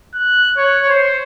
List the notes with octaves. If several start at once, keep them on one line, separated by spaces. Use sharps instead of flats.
F#6
C#5
C5